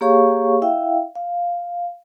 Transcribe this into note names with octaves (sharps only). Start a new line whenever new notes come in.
A#3 G4 G#4 C#5 F5 C#6
E4 E5 F5 G5
F5